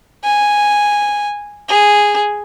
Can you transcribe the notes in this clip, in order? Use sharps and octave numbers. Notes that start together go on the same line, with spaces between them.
G#5
G#4